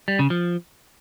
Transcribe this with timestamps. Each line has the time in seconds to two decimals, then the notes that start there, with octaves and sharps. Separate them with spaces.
0.08 G3
0.19 C#3
0.30 F3